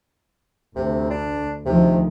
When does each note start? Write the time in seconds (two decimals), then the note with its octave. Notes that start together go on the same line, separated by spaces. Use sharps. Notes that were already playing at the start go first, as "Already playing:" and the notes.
0.76 D2 C3
1.10 D4
1.65 D2 C3 D#3 F3